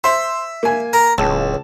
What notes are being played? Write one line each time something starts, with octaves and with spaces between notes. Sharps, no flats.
C5 E5
A#3 G#5
A#4
D1 C#2 A5